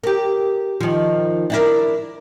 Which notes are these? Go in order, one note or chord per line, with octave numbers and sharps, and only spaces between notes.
G4 A#4
D#3 F3
D4 E4 A#4